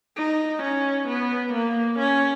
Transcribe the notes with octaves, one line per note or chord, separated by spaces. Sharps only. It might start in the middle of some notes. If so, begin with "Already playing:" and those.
D#4
C#4
B3
A#3
C#4